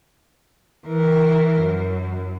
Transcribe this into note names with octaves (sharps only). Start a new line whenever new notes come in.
E3 A#4
F#2